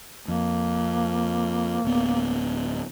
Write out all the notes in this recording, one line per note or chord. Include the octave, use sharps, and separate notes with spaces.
F2 A#3
D1 B3